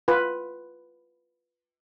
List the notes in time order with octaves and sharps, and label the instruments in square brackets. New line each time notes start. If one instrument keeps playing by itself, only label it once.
[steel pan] F4 B4